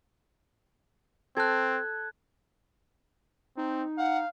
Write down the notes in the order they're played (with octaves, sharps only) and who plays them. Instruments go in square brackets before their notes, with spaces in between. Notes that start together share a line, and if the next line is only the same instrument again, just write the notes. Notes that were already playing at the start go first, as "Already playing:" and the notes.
[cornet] C4 [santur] A4 [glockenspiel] F#6 G#6
[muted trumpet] C4 [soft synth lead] D#4
[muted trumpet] F5 [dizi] F#5